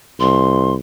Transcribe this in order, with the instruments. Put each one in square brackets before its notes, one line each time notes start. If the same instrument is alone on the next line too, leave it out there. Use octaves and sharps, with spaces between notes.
[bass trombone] C2 [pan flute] C6